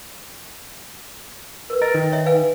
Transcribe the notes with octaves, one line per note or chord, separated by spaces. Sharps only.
A#4 B4
A#4 D#5
D#3
C#5 E5
B4 F5 G#5